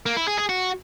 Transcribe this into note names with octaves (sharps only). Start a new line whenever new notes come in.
A#3
E4
G#4
G#4
F#4